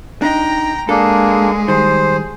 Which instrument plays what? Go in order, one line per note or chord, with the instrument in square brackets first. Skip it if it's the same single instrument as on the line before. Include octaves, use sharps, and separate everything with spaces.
[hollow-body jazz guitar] D4 D#4 [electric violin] G5 A#5
[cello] G#3 [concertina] A#3 D4 [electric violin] G#4 [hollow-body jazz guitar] A4
[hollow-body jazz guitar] D#3 G3 [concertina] C5